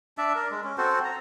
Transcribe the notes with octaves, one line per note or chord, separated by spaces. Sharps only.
D4 D5 E5
A#4
G#3
C#4
C4 F#4 A4 C5
A#5